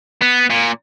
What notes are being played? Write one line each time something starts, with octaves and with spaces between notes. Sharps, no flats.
B3
A#2